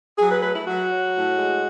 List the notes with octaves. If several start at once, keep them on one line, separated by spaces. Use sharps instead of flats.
F#3 G#4
B4
A3 B4
E4
F#3 F#4
F#3
A2
G#3